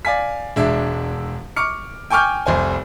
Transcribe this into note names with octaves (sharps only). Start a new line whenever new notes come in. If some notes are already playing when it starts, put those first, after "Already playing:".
D5 F5 G#5 B6
E1 G#3 D4 E5
C#6 D6 F6 C#7
G5 G#5 C#6 D6 F6 G6
F1 C2 C5 G#5